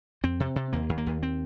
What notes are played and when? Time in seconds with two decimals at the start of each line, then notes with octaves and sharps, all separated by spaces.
0.23 F2 C4
0.40 C3
0.56 C3
0.73 D#2 A#3
0.89 D#2
0.98 A#3
1.06 D#2
1.23 C4